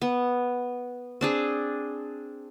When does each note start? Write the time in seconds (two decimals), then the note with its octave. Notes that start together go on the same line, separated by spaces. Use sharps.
0.02 B3
1.21 C4 D4 G#4